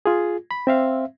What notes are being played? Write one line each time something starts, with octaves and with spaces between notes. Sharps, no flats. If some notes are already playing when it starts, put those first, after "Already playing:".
F4 G#4
B5
C4 E5 F5